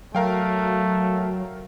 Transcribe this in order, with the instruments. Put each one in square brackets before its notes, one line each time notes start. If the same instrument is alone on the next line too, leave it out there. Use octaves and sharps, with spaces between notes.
[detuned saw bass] F#3 [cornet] A3 [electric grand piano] A#4 F5 G5